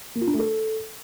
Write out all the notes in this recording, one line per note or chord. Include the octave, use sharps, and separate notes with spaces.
A#3
F4
D4
A3
A4